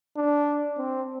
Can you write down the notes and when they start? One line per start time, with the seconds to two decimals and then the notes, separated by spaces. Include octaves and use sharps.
0.16 D4
0.77 C4